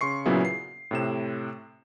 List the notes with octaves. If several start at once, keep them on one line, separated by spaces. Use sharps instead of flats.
C#3 C6 C#6 C7
A#2 C#3 F#3 B3 E4
C7
A2 C3 E7